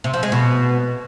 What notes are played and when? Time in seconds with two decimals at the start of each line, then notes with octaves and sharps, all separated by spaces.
0.04 C3
0.14 F3
0.23 G#3
0.32 B2